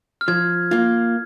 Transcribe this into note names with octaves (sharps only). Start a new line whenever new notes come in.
F6
F3 G#6
A#3 F4